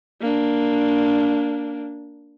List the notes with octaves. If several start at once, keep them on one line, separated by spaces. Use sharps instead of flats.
A#3 D4